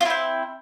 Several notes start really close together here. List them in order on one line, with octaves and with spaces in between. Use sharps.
F4 E4 C4